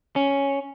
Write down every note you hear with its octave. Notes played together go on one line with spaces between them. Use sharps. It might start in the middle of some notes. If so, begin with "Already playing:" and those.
C#4